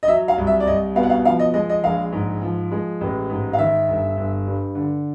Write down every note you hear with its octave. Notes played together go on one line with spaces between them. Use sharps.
D#5
F#3 E5
F5
C2
E5
D5
C2 D#5
B2 F5
F#5
F5
F3 F5
D#5
G#3 D#5
D#5
A#1 F5
G#2
F3
G#3
A1
G#2
F5
D#3 E5
G1
G1
G2
D3